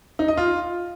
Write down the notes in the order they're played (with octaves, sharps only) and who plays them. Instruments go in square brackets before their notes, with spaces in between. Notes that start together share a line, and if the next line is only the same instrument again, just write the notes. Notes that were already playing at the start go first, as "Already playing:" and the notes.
[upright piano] D#4
D#5
F4